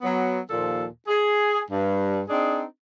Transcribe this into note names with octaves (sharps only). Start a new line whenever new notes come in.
F#3 B3
D#2 A#2 F3 A4
G#4
G2
C4 D4 D#4 G#4